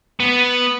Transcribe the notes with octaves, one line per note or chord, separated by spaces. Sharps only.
B3